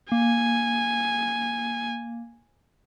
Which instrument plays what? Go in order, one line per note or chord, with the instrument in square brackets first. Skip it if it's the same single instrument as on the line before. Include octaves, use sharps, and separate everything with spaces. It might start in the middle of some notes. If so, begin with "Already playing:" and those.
[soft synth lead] A#3 [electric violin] G#5